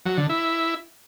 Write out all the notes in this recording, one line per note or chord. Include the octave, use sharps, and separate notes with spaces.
F#3
D3
E4